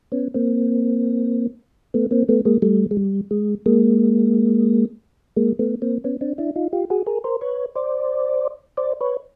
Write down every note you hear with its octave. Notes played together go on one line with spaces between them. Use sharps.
B3 C#4
A#3 C4
A3 B3
A#3 C4
A3 B3
G#3 A#3
G3 A3
G#3
G3
G#3
G#3 A#3
G#3 A#3
A3 B3
A#3 C4
B3 C#4
C4 D4
D4 E4
D#4 F4
F4 G4
F#4 G#4
G#4 A#4
A#4 C5
B4 C#5
C5 D5
C5 D5
B4 C#5